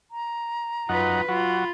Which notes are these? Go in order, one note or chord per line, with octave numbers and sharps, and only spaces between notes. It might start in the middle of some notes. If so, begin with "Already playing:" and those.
A#5
F#2 D#4 F4 B4 F#5
F#3 F4 F#4 B5